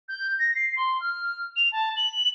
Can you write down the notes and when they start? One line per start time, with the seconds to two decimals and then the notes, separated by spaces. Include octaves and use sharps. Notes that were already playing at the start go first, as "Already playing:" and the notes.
0.09 G6
0.39 A#6
0.55 C7
0.76 C6
1.00 F6
1.56 F7
1.72 A5
1.97 F#7